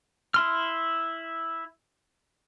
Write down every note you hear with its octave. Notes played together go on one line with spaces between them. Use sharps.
E4 C6 F6